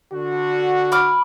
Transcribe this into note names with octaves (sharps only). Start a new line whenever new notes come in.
D3 F#4
B5 D6 F6